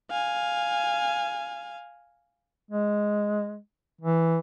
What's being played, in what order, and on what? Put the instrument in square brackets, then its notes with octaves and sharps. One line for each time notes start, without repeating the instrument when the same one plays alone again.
[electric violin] F5 G#5
[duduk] G#3
E3